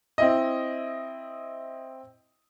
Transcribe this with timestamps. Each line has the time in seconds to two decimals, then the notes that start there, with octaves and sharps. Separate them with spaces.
0.18 C4 E4 D#5